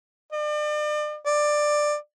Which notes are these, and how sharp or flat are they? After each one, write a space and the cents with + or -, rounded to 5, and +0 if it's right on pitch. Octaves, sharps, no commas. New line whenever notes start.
D5 +40
D5 +15